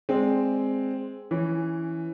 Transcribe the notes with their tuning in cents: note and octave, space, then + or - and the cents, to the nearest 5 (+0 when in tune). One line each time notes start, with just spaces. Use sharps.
G#3 +0 C4 +0 D5 +0
E3 +0 C#4 +0